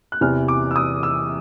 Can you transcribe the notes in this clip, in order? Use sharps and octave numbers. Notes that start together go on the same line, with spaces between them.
F#6
E2 C3 E3 F6
D6
E6
D#6
E6